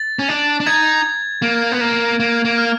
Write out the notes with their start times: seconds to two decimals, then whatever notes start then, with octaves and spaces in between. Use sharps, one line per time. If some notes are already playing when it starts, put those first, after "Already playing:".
Already playing: A6
0.19 C#4
0.29 D4
0.60 D4
0.66 D#4 G#6
1.42 A#3
1.72 B3
1.81 A#3
2.20 A#3
2.45 A#3
2.58 F6